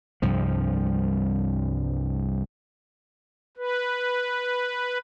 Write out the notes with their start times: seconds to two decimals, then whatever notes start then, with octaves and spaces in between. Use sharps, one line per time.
0.22 C2 G2 F3
3.57 B4